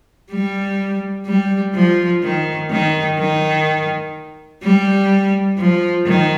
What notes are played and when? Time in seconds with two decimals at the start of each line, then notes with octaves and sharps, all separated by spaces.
0.31 G3
1.26 G3
1.75 F3
2.23 D#3
2.71 D#3
3.19 D#3
4.63 G3
5.58 F3
6.06 D#3